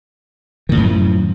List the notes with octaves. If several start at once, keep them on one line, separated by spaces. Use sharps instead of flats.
F#2 A2 D#3 F3